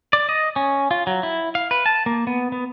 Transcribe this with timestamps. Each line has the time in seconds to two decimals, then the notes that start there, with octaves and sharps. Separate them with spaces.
0.13 D5
0.29 D#5
0.56 C#4
0.91 F4
1.07 F#3
1.23 E4
1.55 F5
1.71 B4
1.86 A5
2.06 A#3
2.27 B3
2.52 B3